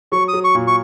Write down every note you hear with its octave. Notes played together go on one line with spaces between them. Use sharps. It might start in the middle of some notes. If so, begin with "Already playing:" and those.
F#3 C#6
D#6
F#3
C#6
A#2
C#6